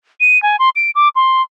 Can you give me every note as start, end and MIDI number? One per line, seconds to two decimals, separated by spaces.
0.20 0.40 99
0.42 0.56 80
0.59 0.69 84
0.76 0.90 98
0.95 1.08 86
1.15 1.42 84